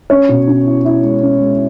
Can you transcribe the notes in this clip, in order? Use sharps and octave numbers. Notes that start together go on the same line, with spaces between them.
C#4 C#5
B2
C#4
E4
E4
G#3
C#4
G#3